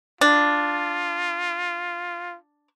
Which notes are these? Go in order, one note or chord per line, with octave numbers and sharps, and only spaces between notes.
D4 F4